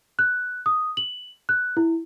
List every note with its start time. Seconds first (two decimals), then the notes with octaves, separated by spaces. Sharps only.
0.19 F#6
0.66 D#6
0.97 F#7
1.49 F#6
1.77 E4